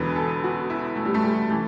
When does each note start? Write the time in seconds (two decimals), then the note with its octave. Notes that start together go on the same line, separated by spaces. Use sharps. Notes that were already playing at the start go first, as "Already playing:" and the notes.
Already playing: E1 E2 D3 B4
0.16 A4
0.44 F#4
0.70 E4
0.96 A3
1.05 G3
1.14 A3
1.24 G3
1.50 E3 A3